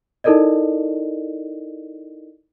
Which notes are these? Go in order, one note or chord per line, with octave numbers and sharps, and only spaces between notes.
D#4 E4 A4 A#4 D5 D#5